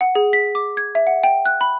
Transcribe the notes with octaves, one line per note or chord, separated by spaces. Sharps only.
F#5
G#4
B6
D6
G#6
E5
F#5
G5
F#6
B5